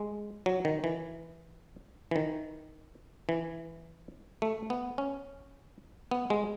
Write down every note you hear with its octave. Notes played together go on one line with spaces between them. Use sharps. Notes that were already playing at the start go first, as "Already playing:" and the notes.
Already playing: G#3
F#3
D#3
E3
E3
D#3
E3
A3
B3
C#4
B3
G#3